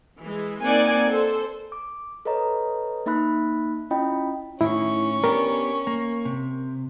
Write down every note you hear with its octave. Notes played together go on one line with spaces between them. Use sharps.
E3 G#3
A#3 C4 D#4 D5 F#5 G#5
A4 C5
D6
A4 B4 C#5 D#5 A#5
A#3 D#4 E5 B5 F#6
C#4 E4 F4 D#5 G5 B5
A2 D#3 C#4 E4 C#6
B3 D4 G4 A#4
A#3
C3